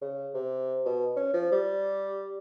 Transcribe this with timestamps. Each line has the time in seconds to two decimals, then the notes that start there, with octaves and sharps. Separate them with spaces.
0.01 C#3
0.34 C3
0.85 B2
1.16 C#4
1.33 F3
1.51 G3